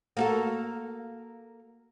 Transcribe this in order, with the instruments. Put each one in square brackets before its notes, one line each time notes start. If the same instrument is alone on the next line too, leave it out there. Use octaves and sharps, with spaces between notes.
[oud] A#3 F#4 A4